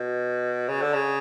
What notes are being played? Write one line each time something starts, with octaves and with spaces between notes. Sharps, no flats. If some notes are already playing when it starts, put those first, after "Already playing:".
Already playing: B2
C#3
D3
C#3